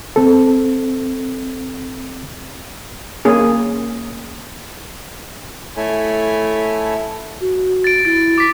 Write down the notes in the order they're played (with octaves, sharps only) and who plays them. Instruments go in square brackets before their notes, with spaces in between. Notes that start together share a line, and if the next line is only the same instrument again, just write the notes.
[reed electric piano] C4 A4
[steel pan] A#3 C#4 G#4
[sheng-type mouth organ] A3 E4 A4 C#5 G#5 B5
[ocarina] F#4
[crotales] A6 D7
[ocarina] E4 [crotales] A6
[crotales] D6 B6